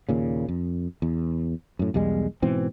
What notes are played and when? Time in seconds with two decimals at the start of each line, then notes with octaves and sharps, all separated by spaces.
0.09 D#2 A#2 C#3
0.48 F2
1.02 E2
1.79 F#2 A2
1.94 B1 E2 G3 G#3
2.42 G#2 B2 E3 C4